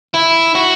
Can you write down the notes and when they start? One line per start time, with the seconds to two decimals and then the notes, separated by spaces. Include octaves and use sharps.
0.14 E4
0.55 F#4